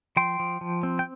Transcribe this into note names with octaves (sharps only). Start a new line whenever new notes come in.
F3 G5 C6
F3
F3
C4
G5